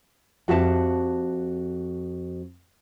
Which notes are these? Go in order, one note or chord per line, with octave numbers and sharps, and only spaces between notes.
F2 F#4 G4 E5 F5 A5